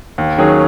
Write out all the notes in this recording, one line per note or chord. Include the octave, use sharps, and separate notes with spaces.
D#2
D#3 F#3 C#4 G#4